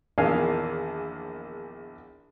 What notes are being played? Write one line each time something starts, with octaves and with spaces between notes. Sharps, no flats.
A#1 E2 D#3 F5 G#5